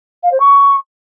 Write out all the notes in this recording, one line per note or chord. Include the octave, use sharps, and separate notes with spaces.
F5
C5
C#6